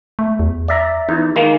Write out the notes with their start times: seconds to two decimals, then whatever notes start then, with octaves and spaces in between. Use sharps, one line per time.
0.19 A3
0.39 E2
0.68 D5 E5 A#5
1.09 E2 D#4
1.36 D#3 G#3 A#3